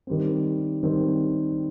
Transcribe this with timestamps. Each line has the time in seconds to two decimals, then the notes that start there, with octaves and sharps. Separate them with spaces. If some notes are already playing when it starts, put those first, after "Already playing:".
0.07 D#3 G3 C4
0.83 D#3 G3 C4